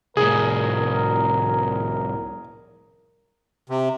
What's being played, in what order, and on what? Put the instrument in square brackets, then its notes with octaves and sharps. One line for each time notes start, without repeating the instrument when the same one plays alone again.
[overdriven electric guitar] C2 A2 [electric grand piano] G#4 [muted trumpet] A#4
[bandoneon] C3